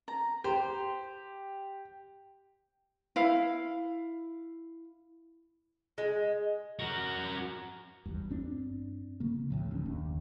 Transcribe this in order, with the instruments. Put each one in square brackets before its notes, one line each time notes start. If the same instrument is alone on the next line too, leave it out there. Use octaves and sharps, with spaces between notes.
[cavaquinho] A#5
[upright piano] G4 [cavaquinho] C5
[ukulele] E4 F5
[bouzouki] G#3
[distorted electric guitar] F#4 A#4
[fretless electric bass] G#1 E2 G2
G2 C4 D4
C#3 A#3
D2 A2 F3
D2 C#4 D4
F#1 D#2